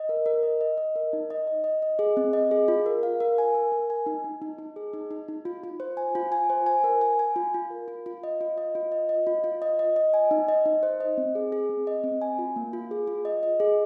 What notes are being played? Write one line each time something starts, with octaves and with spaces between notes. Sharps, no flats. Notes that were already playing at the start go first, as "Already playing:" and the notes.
Already playing: D#5
A#4
A#4
D#5
D#5
D#5
A#4
D#4
D#5
D#5
D#5
D#5
G#4
C4
D#5
G#4
F4
A#4
F5
A#4
G#5
A#4
A#4
G#5
D#4
D#4
D#4
D#4
G#4
D#4
D#4
D#4
F4
F4
C5
G#5
F4
G#5
C5
G#5
A#4
G#5
G#5
F4
F4
A#4
F4
F4
D#5
F4
D#5
F4
D#5
D#5
F4
F4
D#5
D#5
D#5
G#5
D#4
D#5
D#4
C5
D#5
C4
G#4
G#4
C4
D#5
C4
G#5
F4
A#3
F4
G#4
F4
D#5
D#5
G#4